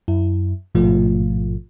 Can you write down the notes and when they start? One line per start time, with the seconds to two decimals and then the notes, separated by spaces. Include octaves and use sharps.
0.08 F#2 E4
0.75 A1 G#2 B2 F3 A3 F4